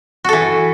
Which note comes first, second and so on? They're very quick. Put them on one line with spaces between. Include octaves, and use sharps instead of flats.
F#4 A4 E3